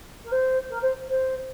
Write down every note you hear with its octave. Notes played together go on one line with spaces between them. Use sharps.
A#4
C5
A#4
C5
C5